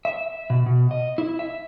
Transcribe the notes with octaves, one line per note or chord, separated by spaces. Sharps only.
E5
B2
B2
D#5
E4
E5